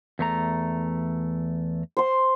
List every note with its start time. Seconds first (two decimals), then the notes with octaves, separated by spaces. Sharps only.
0.19 E2 A3 A#5
1.97 C5 C6